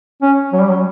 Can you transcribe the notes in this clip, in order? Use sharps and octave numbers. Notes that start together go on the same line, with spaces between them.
C#4
F#3
G3
F#3